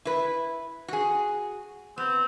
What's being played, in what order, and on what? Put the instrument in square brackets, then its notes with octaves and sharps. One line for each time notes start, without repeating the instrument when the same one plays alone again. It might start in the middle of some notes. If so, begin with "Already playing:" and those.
[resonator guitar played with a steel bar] E4 B4
F#4 G#4
[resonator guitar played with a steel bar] B3 [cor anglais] C4